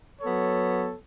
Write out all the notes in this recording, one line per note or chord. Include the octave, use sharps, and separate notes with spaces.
F#3 B3 A4 C#5